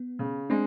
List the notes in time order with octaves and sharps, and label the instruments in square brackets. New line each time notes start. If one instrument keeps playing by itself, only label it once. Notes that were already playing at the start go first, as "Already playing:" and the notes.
Already playing: [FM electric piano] B3
[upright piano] C#3
[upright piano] G#3 [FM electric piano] C4 D4